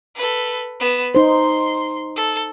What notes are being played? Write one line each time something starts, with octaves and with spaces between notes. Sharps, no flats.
A4 B4
B3 E7
D#4 C5 C6
A4